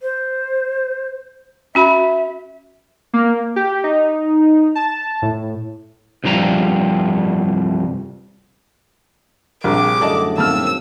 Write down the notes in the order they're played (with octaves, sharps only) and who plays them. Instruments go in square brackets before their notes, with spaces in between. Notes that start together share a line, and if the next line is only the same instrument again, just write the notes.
[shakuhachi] C5
[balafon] C#4 F#4 B5 [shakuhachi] E5
[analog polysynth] A#3
G4
D#4
A5
A2
[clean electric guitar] C2 G2 F3 G3 A#5
[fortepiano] A#1 [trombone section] C3 A#4 [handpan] G3 G4 G#4 [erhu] D6
[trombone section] F#2 A2 D3 [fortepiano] D5 D#5 A5
[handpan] D#3 A#3 C4 [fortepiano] A5 F6 [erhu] E6